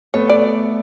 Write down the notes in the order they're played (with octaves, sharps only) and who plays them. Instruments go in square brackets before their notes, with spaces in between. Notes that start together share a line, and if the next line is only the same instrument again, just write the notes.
[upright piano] A3 B3 [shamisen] C#5
[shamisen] D5